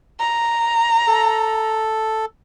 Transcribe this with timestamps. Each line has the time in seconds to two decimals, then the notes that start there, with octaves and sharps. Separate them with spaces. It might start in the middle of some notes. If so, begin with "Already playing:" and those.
0.20 A#5
1.07 A4